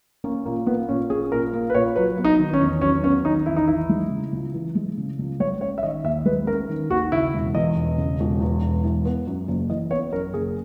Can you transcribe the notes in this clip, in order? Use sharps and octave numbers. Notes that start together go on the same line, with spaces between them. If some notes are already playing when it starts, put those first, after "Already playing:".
A#3 C#4
A#2 A#3
A#3 B3
A#2 C#4
C#4 G#4
A#2 A#4
A#3
B4
A#2 C#5
F#3 B4
B3
D#4
D#3
C#4
E2
F#3 C#4
B3 C#4
D#3 D#4
E2 E4
D#4
E3 E4
G#3
C#3
C#2
E3
G#3
C#3
C#2
G#3 C#5
C#4 C#5
E5
D#3 D#5
D#2 E5
G#3 B4
C#4 A#4
D#3
D#2 F#4
C#3 E4
E1
E2 D#5
E1
C#3
E1
E2
E1
E3
B3
F#2
F#1
E3 D#5
B3 C#5
F#2 A#4
F#1 G#4